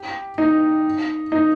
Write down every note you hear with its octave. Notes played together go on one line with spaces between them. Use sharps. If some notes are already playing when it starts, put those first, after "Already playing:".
Already playing: G4
D#4
D#4